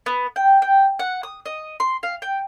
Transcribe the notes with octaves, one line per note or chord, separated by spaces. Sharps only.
B3
G5
G5
F#5
D#6
D#5
C6
F5
G5